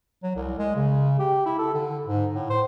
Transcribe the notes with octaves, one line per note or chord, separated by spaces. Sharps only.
F#3
C2
G#3
C#3
G4
E4
A4
D3
G#2
A2
C5